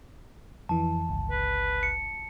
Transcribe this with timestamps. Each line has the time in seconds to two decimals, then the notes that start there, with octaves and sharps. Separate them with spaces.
0.69 F2 E3 A5
1.09 G1 C#2
1.31 B4
1.83 C#7